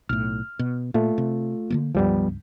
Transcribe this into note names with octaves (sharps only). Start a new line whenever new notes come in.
B1 A2 F6
B2
A#2 A3 F4
C3
D3 D#3 A#3
C#2 G2 F3 G3 B3